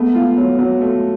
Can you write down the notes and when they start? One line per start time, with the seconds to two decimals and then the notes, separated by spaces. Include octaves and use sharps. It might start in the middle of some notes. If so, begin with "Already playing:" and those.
Already playing: G#3 A3 B3
0.15 F4
0.37 F#3
0.59 F#3
0.81 A3